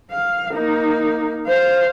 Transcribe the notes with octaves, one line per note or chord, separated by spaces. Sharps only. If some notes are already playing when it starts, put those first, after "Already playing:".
F5
A#3 D#4
C5 F5